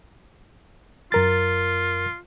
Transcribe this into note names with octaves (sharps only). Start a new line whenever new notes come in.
F#2 F4 A#4 A6